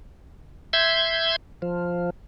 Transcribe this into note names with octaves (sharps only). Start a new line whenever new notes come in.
E5 C6 G6 G#6
F3